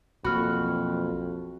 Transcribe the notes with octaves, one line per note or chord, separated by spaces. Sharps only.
B1 F2 E3 A#3 F#4 B5 F6